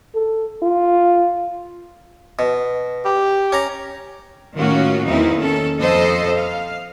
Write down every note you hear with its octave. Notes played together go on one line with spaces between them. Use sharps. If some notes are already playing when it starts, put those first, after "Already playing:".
A4
F4
B2
G4
C#4 A#5
A2 D#3 A#3 C#4 F4 F#4
E2 E3 A#3 C4 D#4 E4
D#3 C#4 A4
F2 A4 C5 D#5
F5